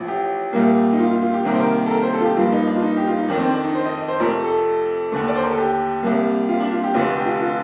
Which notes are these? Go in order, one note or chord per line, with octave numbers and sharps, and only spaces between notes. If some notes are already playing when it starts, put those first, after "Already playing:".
Already playing: A1 A2 F3
G4
C2 A#2 G3 A#3
D#4
F4
F4
F4
G4
C2 C3 D#3 A#3 A#4
C5
A#4
A4
A#4
C5
A4
F4
G4
G2 F3 A#3 F4
D#4
D4
F4
D#4
G4
F4
D#4
F2 D#3 A3 D4
C4
D4
D#4
C5
D#5
D#5
C5
F2 C3 F3 A3 A#4
A4
D#2 D3 A3
D5
C5
A#4
A4
G4
C2 C3 G3 A#3
F4
D4
F4
G4
F1 F2 D3 A3 F4
G4
F4
F4